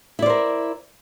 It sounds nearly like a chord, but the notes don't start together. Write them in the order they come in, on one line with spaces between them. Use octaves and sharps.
E4 D5 C5 A#4